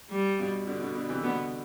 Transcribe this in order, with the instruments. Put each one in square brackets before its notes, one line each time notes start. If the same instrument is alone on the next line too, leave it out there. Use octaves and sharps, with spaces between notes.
[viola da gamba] G3
[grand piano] G2 B2
B2 D3
B2 D3
B2 D3
C3 E3
[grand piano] B2 D3 [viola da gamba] B3